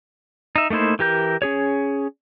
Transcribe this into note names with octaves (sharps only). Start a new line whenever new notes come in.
D#4 E5
A3 A#3 D#4 E4 C5
E3 G4 A#4 G6
C#4 G#4 C#5